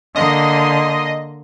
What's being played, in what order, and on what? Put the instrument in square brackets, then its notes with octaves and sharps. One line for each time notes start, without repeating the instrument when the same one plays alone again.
[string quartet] D3 A#3 C6 [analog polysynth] D#5